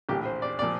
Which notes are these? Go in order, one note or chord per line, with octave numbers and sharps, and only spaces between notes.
A#1 A2 E3 G4
C5
D5
A#2 F3 D5